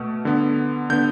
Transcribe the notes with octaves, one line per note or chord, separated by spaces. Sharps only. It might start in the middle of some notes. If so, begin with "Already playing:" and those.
Already playing: B2 A3
D3 B3
D3 B3 G6